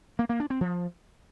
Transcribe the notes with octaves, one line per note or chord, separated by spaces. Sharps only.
A#3
A#3
D4
C4
F3